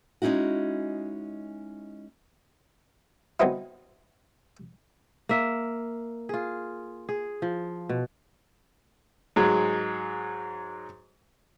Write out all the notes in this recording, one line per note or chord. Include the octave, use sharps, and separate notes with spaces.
G#3 C#4 D#4 E4 F#4
F#3 B3 C4 D#4 E4
A#3 E5
F4 G#4
G#4
F3
B2
G#2 F#3 G#3